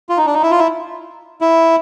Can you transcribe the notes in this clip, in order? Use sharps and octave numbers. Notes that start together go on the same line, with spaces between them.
F4
D#4
D4
D#4
E4
F4
E4
E4